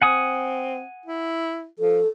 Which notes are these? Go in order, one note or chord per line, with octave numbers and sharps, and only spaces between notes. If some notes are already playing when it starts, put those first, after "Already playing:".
C4 F#5 G#5 D#6
E4
F3 A4